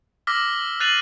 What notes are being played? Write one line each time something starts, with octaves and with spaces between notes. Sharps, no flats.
D6 E6 F6 A#6 B6 G7
F#6 A6 C7 D#7 F7 F#7